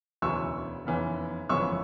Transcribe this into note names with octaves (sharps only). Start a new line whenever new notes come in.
E1 D2 C#3 E3 C#6 E6
F1 E2 C#3 E3
G1 F2 C#3 E3 C#6 E6